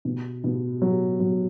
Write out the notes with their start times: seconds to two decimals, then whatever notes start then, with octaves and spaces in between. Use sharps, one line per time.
0.05 B2
0.44 B2
0.82 F#3
1.20 F#3